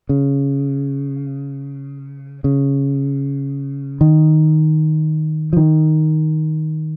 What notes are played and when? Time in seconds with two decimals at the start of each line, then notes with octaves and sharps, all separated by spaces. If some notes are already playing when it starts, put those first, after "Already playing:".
0.09 C#3
2.44 C#3
4.01 D#3
5.53 F3
5.57 D#3